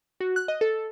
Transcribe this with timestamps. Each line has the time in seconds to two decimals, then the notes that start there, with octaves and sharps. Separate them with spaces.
0.20 F#4
0.36 F#6
0.48 D#5
0.61 A4